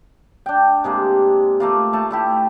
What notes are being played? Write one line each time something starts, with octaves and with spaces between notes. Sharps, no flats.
D4 G5
C3 G#3 A#3
A3 A#3 F4
A3 A5
A3 E4 G4